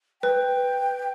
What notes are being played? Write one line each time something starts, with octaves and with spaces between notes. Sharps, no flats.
B4 G5